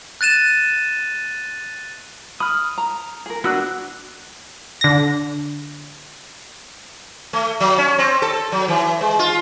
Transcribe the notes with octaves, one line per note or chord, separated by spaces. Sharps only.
F#6 A6 D#7 E7
B5 D#6 F6
A#5
G#4 A#4
B3 D4 F#4 E6 F#6
D3 A#6
A3
F#3
C#4
C4
A4
F#3
E3
G#3
F4